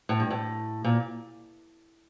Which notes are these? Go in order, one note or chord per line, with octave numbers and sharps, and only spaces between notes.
A2
G2
A2
A#2